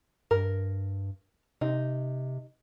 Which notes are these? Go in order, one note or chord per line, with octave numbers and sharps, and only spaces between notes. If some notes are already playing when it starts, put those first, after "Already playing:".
G2 A#4
C3 D#4